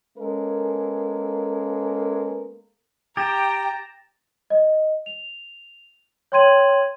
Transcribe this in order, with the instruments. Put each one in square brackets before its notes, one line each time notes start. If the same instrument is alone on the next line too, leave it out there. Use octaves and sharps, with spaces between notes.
[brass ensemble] G#3 A#3 B3 C#4 A4 A#4
[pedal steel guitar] G4 [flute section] G5 [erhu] A#5 [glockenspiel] A6 A#6 E7
[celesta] D#5
F7
C#5 G5 C6 G#6 D#7 F#7